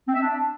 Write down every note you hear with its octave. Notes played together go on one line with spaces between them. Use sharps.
C4
E5
D4